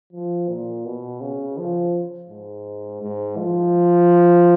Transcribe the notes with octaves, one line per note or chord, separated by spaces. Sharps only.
F3
A#2
B2
C#3
F3
G#2
G#2
F3